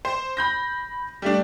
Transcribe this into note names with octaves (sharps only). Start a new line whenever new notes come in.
C5
B5 G6 A#6
G3 A3 D4